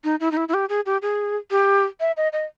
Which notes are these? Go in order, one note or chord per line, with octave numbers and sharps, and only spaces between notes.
D#4
E4
D#4
E4
E4
G4
G#4
G4
G#4
G4
E5
D#5
D#5